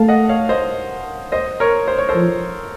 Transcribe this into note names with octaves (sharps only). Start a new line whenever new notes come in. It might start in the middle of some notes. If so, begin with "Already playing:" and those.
Already playing: A3 F5 A5
D#5 F#5
C#5 F5
C5 D#5
C5 D#5
A#4 C#5
C5
C#5
A4 C5
F3